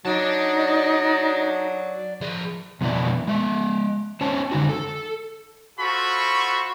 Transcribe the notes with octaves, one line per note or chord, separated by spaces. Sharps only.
F#3 D#4 D5 A5
F3 G#4
F2 B2 E3 E4 D5
G#3 E5
C#4 C5 C#5 A5
D3 D#4 F#4
A4
F4 F#4 A4 C5 B5 C#6